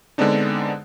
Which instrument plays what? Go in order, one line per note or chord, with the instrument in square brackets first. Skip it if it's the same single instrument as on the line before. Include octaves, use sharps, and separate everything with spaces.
[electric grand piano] D3 G#3 B3 C4 D4 D#4